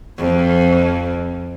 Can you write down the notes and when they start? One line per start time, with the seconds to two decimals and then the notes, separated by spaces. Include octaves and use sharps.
0.18 F2